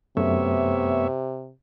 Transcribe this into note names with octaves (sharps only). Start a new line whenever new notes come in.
F#2 C3 A3 B3 C#5 E5